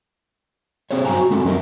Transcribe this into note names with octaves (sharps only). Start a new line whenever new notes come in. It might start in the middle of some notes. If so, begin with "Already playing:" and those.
C4 G#4 C5 C#5
G2 F#3 C5 G5 G#5 A#5
F#4
G#3 A3 C4 C#4 F#4 A4
F#2 F#3 C4 A#4 D#5 E5